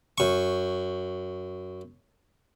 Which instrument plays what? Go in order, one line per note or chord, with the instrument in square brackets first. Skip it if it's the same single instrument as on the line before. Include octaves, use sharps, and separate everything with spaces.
[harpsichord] F#2 C#6